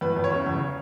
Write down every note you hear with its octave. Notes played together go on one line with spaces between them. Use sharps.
E2 B4
E2
C#5
C#3
E2